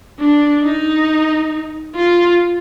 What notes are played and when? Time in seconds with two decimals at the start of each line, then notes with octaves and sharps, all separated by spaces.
0.20 D4
0.63 D#4
1.96 F4